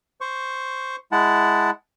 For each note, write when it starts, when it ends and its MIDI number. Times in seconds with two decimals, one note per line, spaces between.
0.21 0.96 72
0.21 0.96 85
1.12 1.70 56
1.12 1.70 64
1.12 1.70 78
1.12 1.70 81